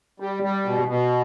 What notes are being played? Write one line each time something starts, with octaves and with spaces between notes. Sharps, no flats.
G3
G3
B2
B2